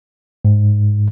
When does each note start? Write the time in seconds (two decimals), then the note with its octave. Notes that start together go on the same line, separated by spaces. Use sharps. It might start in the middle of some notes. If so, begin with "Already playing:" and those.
0.45 G#2